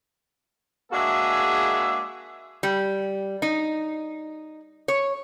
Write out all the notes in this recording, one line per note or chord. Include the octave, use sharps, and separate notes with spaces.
G#3 A#3 D4 F#4 G#4 E5
G3
D#4
C#5